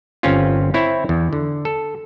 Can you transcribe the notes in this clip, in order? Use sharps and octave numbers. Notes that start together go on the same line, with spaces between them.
G1 C4 C#4 F4
C4 E4 C#5
E2
D3
A4